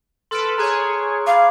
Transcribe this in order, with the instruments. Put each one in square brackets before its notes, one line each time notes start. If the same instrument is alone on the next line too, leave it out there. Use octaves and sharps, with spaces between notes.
[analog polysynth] A4 B4 [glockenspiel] C6 F6 D7
[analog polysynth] G#4 C#5 [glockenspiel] A#5 F#6 G#6
[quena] F5 [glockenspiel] B5 D6